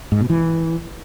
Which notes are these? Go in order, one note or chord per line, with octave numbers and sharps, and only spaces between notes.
G#2
B2
E3